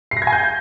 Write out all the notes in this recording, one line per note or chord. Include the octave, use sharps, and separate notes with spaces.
C7
A#6
G#6
G#5
G6